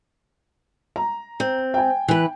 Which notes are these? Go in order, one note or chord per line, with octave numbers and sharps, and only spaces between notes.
A#5
C4
G5 G#5
E3 B4